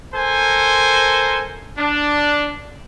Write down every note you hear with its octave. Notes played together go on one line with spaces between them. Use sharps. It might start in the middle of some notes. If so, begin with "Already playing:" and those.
A4 A#4 C5 G#5
D4